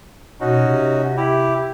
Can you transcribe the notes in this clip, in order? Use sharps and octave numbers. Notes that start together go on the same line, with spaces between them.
B2 C#4 D#4 F#4
C3
E4 G4